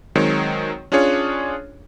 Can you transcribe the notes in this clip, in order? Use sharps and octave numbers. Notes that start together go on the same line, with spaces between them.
D#3 F#3 G#3 C4 C#5
C#4 D4 F4 G#4 C#5